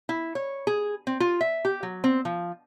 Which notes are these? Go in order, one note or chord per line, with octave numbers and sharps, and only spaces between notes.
E4
C#5
G#4
C4
F4
E5
G4
F#3
C4
F3